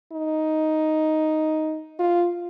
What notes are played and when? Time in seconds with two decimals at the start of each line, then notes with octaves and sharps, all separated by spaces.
0.12 D#4
1.99 F4